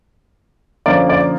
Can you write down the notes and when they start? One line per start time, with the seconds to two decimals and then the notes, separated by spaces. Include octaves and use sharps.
0.86 D3 F3 A#3 C#4 D5
1.09 D5